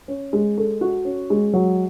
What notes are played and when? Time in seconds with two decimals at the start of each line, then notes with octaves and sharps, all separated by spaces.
0.08 C#4
0.33 G#3
0.58 A4
0.81 F#4
1.05 C#4
1.30 G#3
1.53 F#3